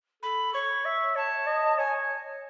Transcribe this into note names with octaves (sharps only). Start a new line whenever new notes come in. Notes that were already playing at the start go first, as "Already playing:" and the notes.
A4 B5
C#5 C#6
E5
C#5 A5
D#5
C#5 G#5